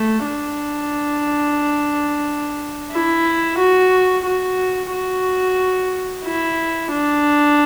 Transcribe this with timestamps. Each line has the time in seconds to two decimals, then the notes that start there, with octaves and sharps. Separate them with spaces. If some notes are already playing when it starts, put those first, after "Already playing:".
Already playing: A3
0.26 D4
2.92 E4
3.58 F#4
4.26 F#4
4.92 F#4
6.25 E4
6.92 D4